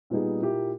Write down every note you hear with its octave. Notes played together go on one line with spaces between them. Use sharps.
A#2 G3 B3 D#4 G#4
A#2 A#3 E4 G4